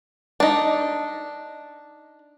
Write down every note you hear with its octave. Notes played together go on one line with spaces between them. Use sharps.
D4 D#4